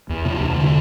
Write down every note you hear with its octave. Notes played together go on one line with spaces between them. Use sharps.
E2
C3
E2
D3